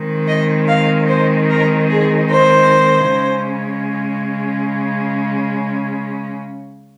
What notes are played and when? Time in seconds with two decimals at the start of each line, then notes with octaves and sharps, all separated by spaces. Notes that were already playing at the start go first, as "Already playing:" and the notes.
Already playing: D#3 G#3 C4 D#4
0.27 D#5
0.68 F5
1.08 C5
1.49 A#4
1.90 G#4
2.30 C5
3.11 C#3 G#3 C#4